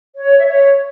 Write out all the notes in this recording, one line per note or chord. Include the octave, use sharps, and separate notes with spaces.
C#5
E5
C#5